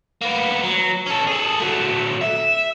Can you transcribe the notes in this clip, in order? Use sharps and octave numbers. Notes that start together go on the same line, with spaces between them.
A#3 B3
F#3
C#4 A4
G#4 A4
F#3 A3
E5